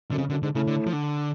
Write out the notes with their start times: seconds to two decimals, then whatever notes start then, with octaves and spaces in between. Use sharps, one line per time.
0.11 F#2 D3
0.18 F2 C#3
0.30 F#2 D3
0.43 G#2 D3
0.55 A2 C#3
0.67 D3
0.87 F3
0.93 D3